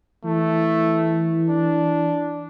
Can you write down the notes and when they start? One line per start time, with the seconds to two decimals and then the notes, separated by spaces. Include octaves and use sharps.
0.25 E3 A3
1.49 D4